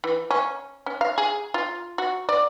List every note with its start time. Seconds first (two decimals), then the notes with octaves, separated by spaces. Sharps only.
0.04 E3
0.31 C#4
0.86 C#4
1.01 F5
1.18 G#4
1.54 F4
1.98 F#4
2.29 D5